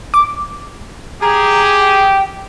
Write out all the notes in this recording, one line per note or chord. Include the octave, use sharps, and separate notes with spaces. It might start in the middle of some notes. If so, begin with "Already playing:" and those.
D6
G4 G#4 A#5
G5